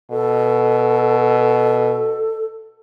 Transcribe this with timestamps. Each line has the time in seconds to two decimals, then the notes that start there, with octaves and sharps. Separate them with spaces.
0.11 B2 A4